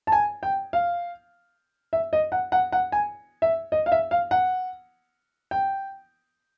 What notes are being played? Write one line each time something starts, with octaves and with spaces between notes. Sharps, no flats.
A5
G#5
G5
F5
E5
D#5
F#5
F#5
F#5
G#5
E5
D#5
F5
E5
F5
F#5
G5